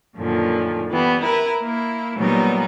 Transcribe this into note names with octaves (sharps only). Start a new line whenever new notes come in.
F#2 A#2 D3 D#3 F3
E3 G3 B3
E4 A#4 B4
A#3 E4
A#2 F#3 G3 B3 D#4